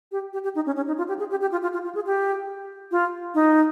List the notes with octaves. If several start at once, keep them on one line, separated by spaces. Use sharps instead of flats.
G4
G4
G4
D#4
C#4
C#4
D#4
F4
G4
G#4
G4
G4
F4
F4
F4
F4
G#4
G4
F4
D#4